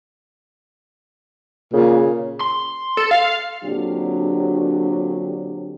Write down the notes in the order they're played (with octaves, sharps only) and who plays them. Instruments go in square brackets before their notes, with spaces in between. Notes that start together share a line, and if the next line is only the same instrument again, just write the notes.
[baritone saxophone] A#2 [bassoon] C#3
[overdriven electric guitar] C6
[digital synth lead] A4
F5
[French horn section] A#2 D3 F#3 C4 D4 G4